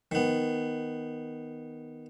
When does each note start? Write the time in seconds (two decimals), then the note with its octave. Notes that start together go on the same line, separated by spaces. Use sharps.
0.12 D#3 B3